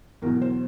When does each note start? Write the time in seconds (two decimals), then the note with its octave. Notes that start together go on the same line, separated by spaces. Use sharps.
0.22 E2 B2 F#3 A#4
0.42 C5